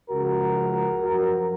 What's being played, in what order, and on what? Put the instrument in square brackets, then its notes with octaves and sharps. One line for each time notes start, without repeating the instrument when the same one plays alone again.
[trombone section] C#2 C#3 F3 F#4 A#4
F#2 F3 F#4 A#4